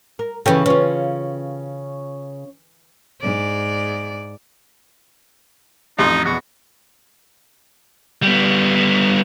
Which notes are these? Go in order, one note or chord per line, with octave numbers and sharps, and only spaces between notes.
A#4
C#3 E3 C#4 G4 A4
C#3 C#4 F4
G#2 D5
A1 F2 D#4 C6
E2 B2 F#4
G3 B3